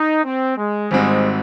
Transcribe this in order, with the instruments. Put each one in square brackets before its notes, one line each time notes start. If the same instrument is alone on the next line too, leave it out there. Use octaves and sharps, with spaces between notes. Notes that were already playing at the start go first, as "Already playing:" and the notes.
Already playing: [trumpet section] D#4
C4
G#3
[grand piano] G#1 G#2 G3 C4 [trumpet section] G#3